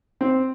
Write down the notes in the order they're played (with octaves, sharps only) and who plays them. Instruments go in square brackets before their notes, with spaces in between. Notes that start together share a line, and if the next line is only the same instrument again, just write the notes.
[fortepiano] C4